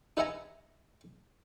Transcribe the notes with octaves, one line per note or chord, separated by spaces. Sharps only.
D#4 B4 E5 F#5 G#5 A#5